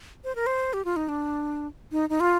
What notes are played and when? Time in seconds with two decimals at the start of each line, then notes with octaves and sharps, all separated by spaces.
0.24 C5
0.36 A#4
0.46 C5
0.73 G4
0.85 F4
0.96 D#4
1.09 D4
1.92 D#4
2.10 D#4
2.20 F4